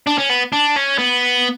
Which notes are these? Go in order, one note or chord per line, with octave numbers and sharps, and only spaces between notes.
D4
C#4
B3
D4
C#4
B3